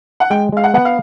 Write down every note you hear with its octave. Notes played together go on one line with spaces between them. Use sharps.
F#5
G#3 G5
G#3 F5
F#5
B3 F#5
F5